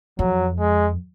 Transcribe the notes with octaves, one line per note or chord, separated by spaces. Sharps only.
F2 F#3
G#3